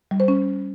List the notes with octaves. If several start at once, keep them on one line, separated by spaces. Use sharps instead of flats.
G3
C5
C#4